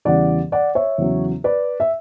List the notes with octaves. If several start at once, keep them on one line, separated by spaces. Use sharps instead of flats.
E2 C#3 E3 G3 D5 F#5
D5 F#5
C#5 E5
E2 C#3 F#3
B4 D5
E5